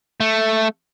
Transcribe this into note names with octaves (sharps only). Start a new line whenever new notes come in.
A3